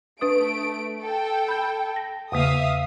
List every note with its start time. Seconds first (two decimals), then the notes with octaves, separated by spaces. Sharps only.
0.21 A3 D4 B4 D#6 D7
1.01 A4 G5
1.48 B5 G6
1.96 A#6
2.32 E2 C#3 A#3 E5 F5 D#6